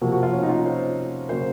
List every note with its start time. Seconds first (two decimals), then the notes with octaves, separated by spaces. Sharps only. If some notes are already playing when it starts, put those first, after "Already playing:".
0.01 C3 F3 A#3 F#4
0.12 F#4
0.23 F4
0.33 C#4
0.42 D#4
0.49 F4
0.66 C5
1.29 C#3 F#3 A#3 C5